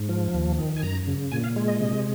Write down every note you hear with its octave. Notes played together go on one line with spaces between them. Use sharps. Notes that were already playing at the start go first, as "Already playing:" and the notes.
Already playing: G#2
F3
D#2
D#3
G#5
F#2 A#5
C#3
A#2 G#5
F5
G#3
D#5
C3